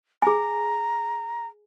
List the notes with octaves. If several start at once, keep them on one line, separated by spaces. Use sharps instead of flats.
G#4 G#5 A#5